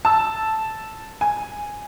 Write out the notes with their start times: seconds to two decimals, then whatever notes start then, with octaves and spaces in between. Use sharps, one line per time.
0.05 A5 E6
1.21 G#5